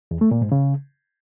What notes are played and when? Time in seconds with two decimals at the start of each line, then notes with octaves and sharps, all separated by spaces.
0.11 E2
0.21 A3
0.31 A#2
0.41 G#2
0.52 C#3